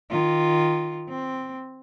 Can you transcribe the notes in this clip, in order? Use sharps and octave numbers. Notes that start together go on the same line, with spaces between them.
D#3 F4
C4